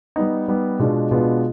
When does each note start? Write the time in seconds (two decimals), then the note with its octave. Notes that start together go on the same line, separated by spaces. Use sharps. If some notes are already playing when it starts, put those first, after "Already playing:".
0.16 G3 B3 D#4
0.48 G3 B3 D#4
0.79 B2 G#3 B3 D4 F4
1.11 B2 G#3 B3 D4 F4